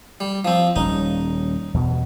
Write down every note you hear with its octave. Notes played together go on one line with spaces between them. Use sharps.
G3
F3 C4
D#1 G3 C#4 D#4
E2 G2 B2